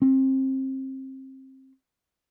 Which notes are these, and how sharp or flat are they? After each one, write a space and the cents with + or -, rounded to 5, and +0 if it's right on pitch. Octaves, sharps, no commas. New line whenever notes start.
C4 +25